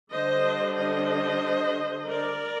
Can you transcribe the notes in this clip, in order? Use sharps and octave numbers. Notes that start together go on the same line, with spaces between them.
D3 G3 D4 C5 D#5
C5 D#5
A#4 D5